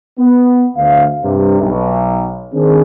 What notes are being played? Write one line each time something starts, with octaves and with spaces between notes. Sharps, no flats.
B3
D2 F5
G2 C3
B1
D#3 C4 D4 G#4